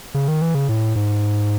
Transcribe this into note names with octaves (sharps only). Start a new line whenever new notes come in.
C#3
D#3
E3
C#3
A2
G#2